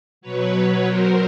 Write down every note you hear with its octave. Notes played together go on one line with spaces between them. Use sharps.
B2 F#3 B4 C#5
A#4 C5